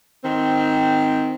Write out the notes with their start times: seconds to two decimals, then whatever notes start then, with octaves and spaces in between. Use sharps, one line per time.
0.24 D#3 C4